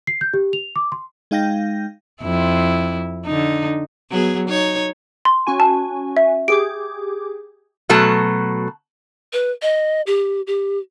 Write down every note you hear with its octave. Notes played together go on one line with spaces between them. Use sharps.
C7
G6
G4
F7
D6
C6
G#3 D#4 F5 G5 G6 A#6
F2 E4
D3 D#4
F#3 B3 G#4
D#4 C#5
C6
C#4 F#4 G#5
A5
E5
G4 G#4 D6 D7
B2 F#3 A3 A5
B4
D#5
G4
G4